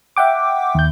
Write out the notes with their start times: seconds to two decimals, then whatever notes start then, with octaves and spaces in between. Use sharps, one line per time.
0.17 E5 F#5 G5 D6
0.75 D#2 G6